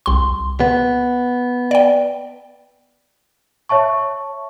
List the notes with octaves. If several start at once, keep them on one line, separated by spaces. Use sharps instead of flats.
C2 C6
B3
D5 G5
C#5 E5 A5 C#6